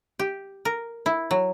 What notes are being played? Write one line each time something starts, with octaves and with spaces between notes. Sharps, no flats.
G4
A#4
E4
F#3